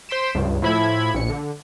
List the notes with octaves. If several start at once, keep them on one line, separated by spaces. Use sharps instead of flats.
C5 C6 B6 D7 E7
C#2 G2
A2 F3 E4 B5 G#6
A#1 C#7
D3